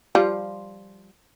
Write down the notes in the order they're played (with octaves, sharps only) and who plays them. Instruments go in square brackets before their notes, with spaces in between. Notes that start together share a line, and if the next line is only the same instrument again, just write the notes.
[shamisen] F3 G3 F4